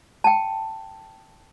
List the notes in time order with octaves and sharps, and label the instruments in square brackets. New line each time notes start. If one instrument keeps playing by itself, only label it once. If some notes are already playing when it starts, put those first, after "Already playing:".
[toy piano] G5 A5